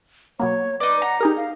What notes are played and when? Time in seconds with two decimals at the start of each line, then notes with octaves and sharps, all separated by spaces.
0.40 B2 F#3 A#3 C#5
0.80 D#4 B4 D5
1.02 F#5 A#5
1.20 D#4 G4 G#4 A#4
1.37 F5